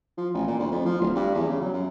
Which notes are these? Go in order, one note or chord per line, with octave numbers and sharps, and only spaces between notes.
F3
A1
A#2
D2
F2
F3
D1
G2
E2
C#3
F#3
F#2